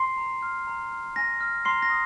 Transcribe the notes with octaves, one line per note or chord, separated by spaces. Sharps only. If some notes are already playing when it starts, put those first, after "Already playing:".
Already playing: C6 C7
A#5
F6
A#5
F6
G#5 A#6
F6
A#5 C6 C7
A#6
D#6